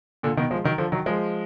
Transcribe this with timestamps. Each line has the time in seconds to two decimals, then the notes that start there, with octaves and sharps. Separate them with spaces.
0.23 A#2 D3
0.37 B2 D#3
0.51 F3 G#3
0.64 D#3 F#3
0.78 D3 F3
0.92 D#3 F#3
1.06 F3 G#3